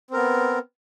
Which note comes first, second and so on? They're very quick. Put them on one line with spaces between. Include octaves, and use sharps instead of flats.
C4 A#4 B3